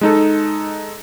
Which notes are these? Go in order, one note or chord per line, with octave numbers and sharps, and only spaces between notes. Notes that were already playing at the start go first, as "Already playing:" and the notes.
G#3 D#4 A4